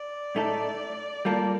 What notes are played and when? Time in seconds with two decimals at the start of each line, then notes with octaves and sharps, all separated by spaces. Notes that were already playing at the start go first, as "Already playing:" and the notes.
Already playing: D5
0.35 A2 A3 D#4 A4
1.25 G3 A#3 F4 A4